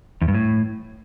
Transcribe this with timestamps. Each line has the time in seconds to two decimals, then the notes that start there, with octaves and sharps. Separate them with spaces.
0.22 E2
0.28 G2
0.34 A2